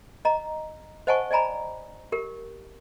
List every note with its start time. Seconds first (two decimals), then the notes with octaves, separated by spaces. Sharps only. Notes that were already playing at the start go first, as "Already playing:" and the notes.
0.25 D#5 A#5
1.07 C5 D#5 F#5 G#5 A5 C#6
1.31 D5 D#5 G#5 A#5 B5
2.12 G4 A#4